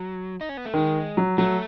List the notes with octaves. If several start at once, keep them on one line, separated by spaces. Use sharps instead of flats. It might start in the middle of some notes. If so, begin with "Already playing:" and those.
Already playing: F#3
D#4
C#4
B3
A3
D#3 G#3
F#3
F#3 A3